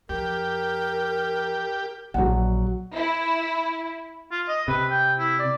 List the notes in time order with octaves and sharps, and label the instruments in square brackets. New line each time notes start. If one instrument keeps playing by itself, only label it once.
[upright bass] F2 [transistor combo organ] G4 [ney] A#4
[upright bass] A#1 D3 [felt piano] F#3 F#5
[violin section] E4
[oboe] F4
D#5
[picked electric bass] C3 [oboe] B4
[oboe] G5
E4
D5